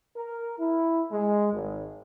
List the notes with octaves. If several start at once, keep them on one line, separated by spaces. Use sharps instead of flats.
A#4
E4
G#3
G#1